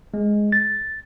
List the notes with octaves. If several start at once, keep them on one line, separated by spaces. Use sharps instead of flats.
G#3
A6